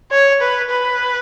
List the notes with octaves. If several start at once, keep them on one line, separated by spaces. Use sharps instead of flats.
C#5
B4
B4